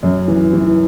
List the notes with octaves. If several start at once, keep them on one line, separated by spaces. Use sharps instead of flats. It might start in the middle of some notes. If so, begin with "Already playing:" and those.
F#2
E3
E3